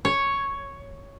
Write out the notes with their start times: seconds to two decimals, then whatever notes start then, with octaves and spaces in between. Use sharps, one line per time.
0.05 C#5